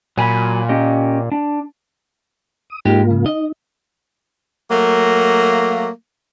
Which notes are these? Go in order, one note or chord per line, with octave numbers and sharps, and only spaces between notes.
A#2 F#3 G#5 B5
C#4 G4 D#5
D4
D#6
G#2 G#3 A#3 D#4 F4 G4
C#3
D#4 D#5
F#3 A3 A#3